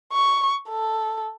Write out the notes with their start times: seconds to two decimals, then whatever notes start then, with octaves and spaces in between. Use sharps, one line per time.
0.13 C#6
0.69 A4